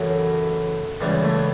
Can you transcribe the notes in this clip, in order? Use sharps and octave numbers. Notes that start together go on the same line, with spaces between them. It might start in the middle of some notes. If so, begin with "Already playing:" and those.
Already playing: F#2 C#3 E3 A3
C#2 C#3 E3 G3
A3